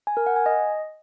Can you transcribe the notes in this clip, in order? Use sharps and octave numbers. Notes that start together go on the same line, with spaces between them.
G#5
A#4
F#5
G#5
D#5